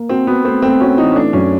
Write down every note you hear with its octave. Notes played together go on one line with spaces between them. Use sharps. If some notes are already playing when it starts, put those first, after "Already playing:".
Already playing: A#3
C4 F#4
B3 F#4
A3 C4
A3 C4
C#4 F#4
E3 D#4
C#4
A3 D4
F#2 C#4